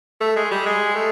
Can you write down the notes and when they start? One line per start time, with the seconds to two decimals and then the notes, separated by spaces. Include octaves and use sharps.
0.21 A3
0.36 G#3
0.51 G3
0.66 G#3
0.96 A3